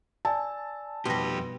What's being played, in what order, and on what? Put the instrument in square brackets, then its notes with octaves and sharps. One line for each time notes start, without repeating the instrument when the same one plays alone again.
[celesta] D5 G#5 E6 [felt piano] A5
[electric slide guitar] F2 G4 [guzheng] B2 G3 [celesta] C6 A#6